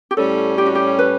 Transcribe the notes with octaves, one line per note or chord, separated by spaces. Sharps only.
G4
A2 G3 C#4 A4
G4
F#4
G4
B4